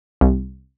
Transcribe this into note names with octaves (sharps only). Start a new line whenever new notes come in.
C2